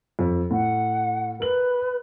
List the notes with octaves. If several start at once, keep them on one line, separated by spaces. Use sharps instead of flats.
F2
A2 F#5
A#4 B4 F#7